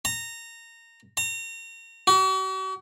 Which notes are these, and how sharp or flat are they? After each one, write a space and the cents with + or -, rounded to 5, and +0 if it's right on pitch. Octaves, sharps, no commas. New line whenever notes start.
A#5 -20
A#5 -35
F#4 +45